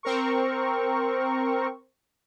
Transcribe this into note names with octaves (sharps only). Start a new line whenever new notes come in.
C4 A#4 C#6